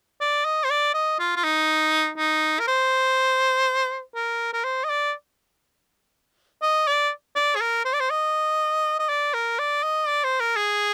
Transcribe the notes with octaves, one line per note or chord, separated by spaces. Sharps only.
D5
D#5
C5
D5
D#5
F4
F4
D#4
D#4
A#4
C5
A#4
A#4
C5
D#5
D5
D#5
D5
D5
G#4
A#4
C5
D5
C5
D#5
D#5
D5
A#4
D5
D#5
D5
C5
A#4
G#4